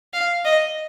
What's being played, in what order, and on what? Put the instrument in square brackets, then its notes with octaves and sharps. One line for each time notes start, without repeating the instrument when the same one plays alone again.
[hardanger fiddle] F5
D#5